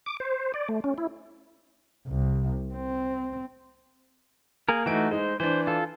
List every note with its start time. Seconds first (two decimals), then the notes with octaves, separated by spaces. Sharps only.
0.06 D6
0.20 C5
0.54 D5
0.69 A3
0.84 C#4
0.98 E4
2.07 C2
2.73 C4
4.69 A#3 G#4 A#4
4.86 E3 A3 D#4 F#4 D7
5.11 G#3 D#4 C5
5.40 E3 D4 C5
5.67 F4 A4